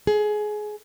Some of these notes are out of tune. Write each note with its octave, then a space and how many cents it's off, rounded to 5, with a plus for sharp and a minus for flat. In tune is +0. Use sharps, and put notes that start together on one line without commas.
G#4 +20